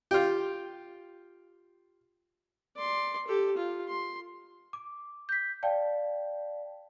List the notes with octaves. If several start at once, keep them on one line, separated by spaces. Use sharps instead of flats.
F4 G4
D5 C6
G4 A4
F4
C6
D6
G6 B6
D5 F5 G5 A5